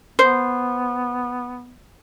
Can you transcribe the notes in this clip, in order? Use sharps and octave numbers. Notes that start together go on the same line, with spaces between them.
B3 C5